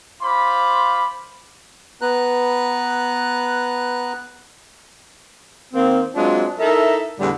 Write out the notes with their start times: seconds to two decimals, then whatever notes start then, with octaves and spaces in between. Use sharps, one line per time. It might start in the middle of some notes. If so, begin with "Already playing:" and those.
0.21 F4 C5 B5 D6
2.02 B3 B4 A#5 F#6
5.74 D#3 A#3 C4
6.15 F#3 G#3 C4 D4 F4
6.59 D#4 E4 A4 A#4 E5
7.19 E2 A2 D3 G3